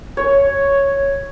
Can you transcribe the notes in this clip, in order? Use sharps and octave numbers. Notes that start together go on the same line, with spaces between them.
C#5